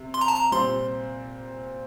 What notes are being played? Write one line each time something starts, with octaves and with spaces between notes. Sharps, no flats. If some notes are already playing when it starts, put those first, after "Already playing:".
Already playing: C3
C6
A#5
A5
A#5
A#2 G3 C4 C6